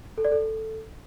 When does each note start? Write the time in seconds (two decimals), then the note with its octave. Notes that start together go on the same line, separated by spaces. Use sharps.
0.18 A4
0.25 D5
0.32 A4